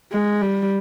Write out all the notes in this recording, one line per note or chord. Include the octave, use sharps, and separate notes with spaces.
G#3
G3